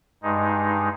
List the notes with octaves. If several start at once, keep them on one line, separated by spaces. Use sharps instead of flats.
G2 G#3 D#4